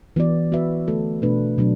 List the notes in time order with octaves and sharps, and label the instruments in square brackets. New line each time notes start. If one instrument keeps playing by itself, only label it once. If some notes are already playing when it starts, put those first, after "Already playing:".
[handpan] E3 B3 F#4 D5
B3 F#4 B4 E5
D3 A3 F#4 A4
B2 A3 D4 B4
B2 F#3 D4